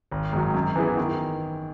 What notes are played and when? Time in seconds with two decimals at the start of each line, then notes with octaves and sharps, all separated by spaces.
0.12 G#1
0.33 G#2 D#3 F#3
0.54 F#2
0.76 E3 B3 E4 G#4
0.97 D#3